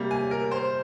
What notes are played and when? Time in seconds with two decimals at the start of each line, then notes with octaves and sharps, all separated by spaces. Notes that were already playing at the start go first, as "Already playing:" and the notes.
Already playing: C3 G3 A#3
0.11 G#5
0.31 A#4
0.51 C5